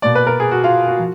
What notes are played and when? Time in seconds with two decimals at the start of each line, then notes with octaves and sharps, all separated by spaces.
0.02 B2 A#3 D5
0.15 B4
0.27 A#4
0.40 G#4
0.51 F#4
0.64 F4
0.88 F#4
0.99 F3